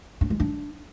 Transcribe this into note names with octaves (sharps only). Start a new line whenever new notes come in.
D4
G#3
D4